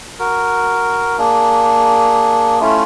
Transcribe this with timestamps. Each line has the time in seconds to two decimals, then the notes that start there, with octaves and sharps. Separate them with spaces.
0.19 F#4 A#4
1.18 A#3 D4 G#4
2.61 A3 C#4 E4 F4